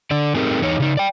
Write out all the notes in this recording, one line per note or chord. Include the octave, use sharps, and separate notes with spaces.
D3 D5
A3 C4 D#4 G4 G#4 A#4
E2 D#4 C#5
C#3 D#4
D5 G5